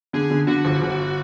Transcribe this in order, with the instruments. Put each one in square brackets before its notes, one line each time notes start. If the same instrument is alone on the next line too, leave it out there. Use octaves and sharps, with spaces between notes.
[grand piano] D3 [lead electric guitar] G#4
[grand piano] D3
[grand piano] D3 [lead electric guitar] F#4
[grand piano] G1
G1